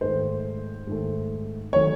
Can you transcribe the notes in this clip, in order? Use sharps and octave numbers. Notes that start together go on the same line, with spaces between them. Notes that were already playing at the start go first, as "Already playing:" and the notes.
G#2 D#3 A3 C5
G#2 D#3 A3
D#3 F#3 A3 C#5